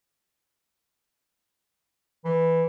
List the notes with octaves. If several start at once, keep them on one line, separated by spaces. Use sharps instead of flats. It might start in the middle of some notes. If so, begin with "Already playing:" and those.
E3